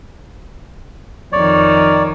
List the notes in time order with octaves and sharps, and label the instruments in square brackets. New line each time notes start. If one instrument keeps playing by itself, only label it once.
[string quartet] F2 D#3 [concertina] C#5 D5